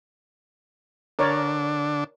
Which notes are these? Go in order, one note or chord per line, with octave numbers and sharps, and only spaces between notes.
D3 D4 A#4 C#5 D5